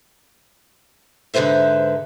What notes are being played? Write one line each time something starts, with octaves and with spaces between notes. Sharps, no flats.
G#2 D3 F3 B4 C5 E5